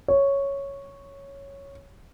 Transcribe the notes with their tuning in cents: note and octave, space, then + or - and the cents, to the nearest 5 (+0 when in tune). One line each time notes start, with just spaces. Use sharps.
C#5 +0